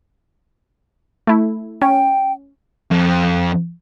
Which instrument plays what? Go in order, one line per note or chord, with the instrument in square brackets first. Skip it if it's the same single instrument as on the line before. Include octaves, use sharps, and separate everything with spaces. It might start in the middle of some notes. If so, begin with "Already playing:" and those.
[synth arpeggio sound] A3 E4
[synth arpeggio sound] C#4 [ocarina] G5
[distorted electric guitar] F2